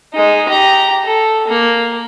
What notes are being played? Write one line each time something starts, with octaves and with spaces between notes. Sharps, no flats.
G#3 D#4
G4 A#5
A4
A#3